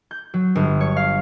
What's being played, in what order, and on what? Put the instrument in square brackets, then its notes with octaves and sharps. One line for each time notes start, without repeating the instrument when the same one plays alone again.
[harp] G6
F#3
G1
C#5
F5